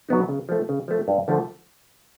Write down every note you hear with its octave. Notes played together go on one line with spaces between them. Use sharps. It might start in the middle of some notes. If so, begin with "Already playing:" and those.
F#3 B3 D#4
C#3
F3 A3
C#3
F3 A3
G2
D3 F3 A3